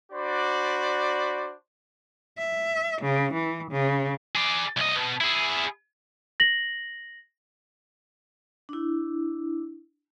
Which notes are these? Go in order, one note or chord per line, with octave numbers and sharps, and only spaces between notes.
D4 F#4 C5 D5 B5
E5
C#3
E3
C#3
G#4 D5
C2 D#5
B2
E4 G#4
A#6 F#7
D4 E4